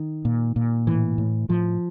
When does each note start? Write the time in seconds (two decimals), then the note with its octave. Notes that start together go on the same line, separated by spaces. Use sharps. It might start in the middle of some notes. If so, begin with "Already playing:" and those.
Already playing: D#3
0.25 A#2
0.56 A#2
0.87 A2 E3
1.18 A2
1.49 A2 F3